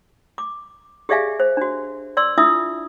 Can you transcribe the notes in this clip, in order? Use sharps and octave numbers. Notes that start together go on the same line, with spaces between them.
D6
G4 G#4 D5 E5 F5 G#5
C5
D4 F#4
D5 C6 E6
D4 E4 F4 E5 D#6 E6